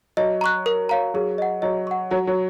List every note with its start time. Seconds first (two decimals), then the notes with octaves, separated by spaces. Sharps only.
0.17 F#3 D#5
0.41 A#5 C#6 F#6
0.66 A#4
0.89 C#5 F5 A#5
1.14 F#3 G#4
1.38 D#5 F#5
1.62 F#3 D#5
1.87 F#5 C#6
2.11 F#3 F#5
2.27 F#3